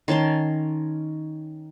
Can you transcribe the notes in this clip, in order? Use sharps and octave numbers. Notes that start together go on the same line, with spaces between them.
D#3 C#4 A5 C6